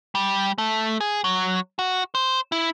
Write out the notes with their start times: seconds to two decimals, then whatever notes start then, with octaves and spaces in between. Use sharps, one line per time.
0.15 G3
0.58 A3
1.01 G#4
1.24 F#3
1.79 F#4
2.15 C5
2.52 E4